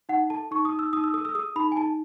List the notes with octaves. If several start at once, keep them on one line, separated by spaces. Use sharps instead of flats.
D#4 F#5
A4 A5
D#4 C#6
D#6
D#4
E6
D#4 D#6
E6
A4 D#6
E6
G#4 D#6
D#4 B5
G#5
D#4 A5